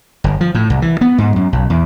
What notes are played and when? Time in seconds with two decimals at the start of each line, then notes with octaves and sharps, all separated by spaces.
0.24 G1
0.41 F3
0.55 A2
0.70 C2
0.82 E3
1.01 B3
1.18 G#2
1.36 F#2
1.53 B1
1.70 E2